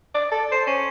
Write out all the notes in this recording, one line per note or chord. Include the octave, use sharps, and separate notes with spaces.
D5
A4
C5
C#4